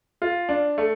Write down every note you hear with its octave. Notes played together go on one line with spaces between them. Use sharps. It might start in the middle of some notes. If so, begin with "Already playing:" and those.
F4
D4
A3